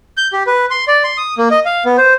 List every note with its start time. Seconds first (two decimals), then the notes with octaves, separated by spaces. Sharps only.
0.17 G6
0.33 G4
0.47 B4
0.71 C6
0.88 D5
1.04 C6
1.18 D#6
1.38 A#3
1.51 D#5
1.65 F5
1.85 B3
1.98 C5